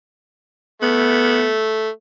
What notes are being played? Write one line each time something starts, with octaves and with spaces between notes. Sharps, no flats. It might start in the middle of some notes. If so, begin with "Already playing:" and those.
A3 B3